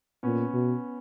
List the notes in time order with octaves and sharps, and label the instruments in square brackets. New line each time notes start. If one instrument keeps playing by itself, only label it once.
[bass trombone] A#2 [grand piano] B3 C#4
[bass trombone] B2